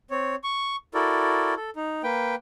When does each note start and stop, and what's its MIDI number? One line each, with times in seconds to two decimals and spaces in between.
0.11 0.36 60
0.11 0.36 73
0.44 0.76 85
0.94 1.54 64
0.94 1.54 66
0.94 1.54 69
0.94 1.54 70
0.94 1.54 74
1.56 1.70 69
1.76 2.02 63
2.04 2.35 58
2.04 2.35 71
2.04 2.35 79